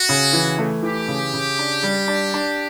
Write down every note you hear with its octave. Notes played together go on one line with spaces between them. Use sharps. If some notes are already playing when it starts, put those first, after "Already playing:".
Already playing: F#4
C#3
E3
A3
E3 G4
C#3
C#3
D4
G3
D4
D4